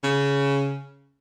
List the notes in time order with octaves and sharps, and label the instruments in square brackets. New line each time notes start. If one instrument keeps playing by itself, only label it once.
[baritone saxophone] C#3